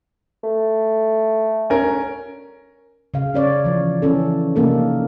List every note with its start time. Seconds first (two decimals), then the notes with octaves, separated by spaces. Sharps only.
0.43 A3
1.70 C#4 A#4
3.14 C#3 F5
3.34 C#4 C#5 D5
3.64 E3 F3
4.02 E3 C#4 A4
4.56 C3 A3 A#3 C#4 D#4 A4